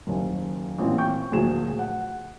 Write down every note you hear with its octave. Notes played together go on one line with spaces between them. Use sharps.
F#1 D#2
A1 A#2 E3 C4
G5 C#6 G6
D2 A#2 F3 F#3 G#4 E7
F#5